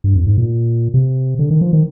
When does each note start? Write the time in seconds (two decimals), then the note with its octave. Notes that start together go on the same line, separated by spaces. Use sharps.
0.04 G2
0.15 F2
0.27 G#2
0.38 A#2
0.94 C3
1.39 D3
1.51 D#3
1.61 F3
1.73 D#3